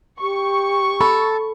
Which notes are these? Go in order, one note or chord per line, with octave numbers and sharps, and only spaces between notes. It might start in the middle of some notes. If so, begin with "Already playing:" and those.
G4 C#6
A4 B5